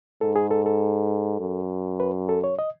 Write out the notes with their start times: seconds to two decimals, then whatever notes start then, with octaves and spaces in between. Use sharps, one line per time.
0.21 G#2 A4
0.36 G#4
0.51 A4
0.66 A4
1.40 F#2
2.00 B4
2.29 A4
2.44 C#5
2.59 D#5